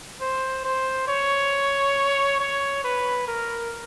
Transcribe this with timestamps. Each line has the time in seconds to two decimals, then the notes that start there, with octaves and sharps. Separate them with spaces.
0.21 C5
0.65 C5
1.08 C#5
2.40 C#5
2.84 B4
3.28 A#4